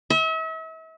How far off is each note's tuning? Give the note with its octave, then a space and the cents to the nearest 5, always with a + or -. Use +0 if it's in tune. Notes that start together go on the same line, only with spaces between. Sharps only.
E5 -40